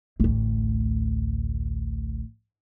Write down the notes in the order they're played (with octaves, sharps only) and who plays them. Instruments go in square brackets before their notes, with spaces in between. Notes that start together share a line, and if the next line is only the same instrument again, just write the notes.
[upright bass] A1 D2